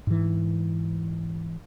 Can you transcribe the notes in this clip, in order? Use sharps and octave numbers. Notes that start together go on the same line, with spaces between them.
G#2 E3